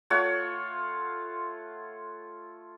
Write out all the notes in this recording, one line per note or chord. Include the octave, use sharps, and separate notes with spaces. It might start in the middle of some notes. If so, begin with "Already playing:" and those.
A3 F4 C#5 F#5